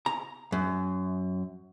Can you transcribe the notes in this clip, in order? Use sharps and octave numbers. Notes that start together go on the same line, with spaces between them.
A#5
F#2